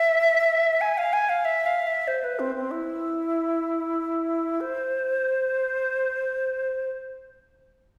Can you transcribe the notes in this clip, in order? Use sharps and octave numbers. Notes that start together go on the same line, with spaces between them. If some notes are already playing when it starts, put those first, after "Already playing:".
Already playing: E5
G#5
F5
G#5
F5
E5
F5
E5
C5
B4
C4
C4
E4
C5